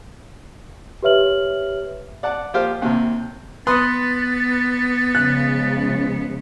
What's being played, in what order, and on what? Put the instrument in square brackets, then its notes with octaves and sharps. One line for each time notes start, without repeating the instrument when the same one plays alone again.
[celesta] G4 B4 C#5 E5 F6 F#7
[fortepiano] D5 F#5 A5
F3 A#3 F4 G4 C5 F5
D#2 C3
[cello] B3 [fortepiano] B4 C6 D#6 [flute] A6
[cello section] C#3 F3 G#3 [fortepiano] F#6